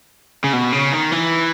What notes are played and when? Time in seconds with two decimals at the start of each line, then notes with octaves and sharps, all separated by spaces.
0.44 C#3
0.53 B2
0.72 C#3
0.93 D#3
1.12 E3